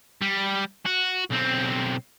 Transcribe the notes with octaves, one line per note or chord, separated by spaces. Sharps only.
G3
F#4
B1 C4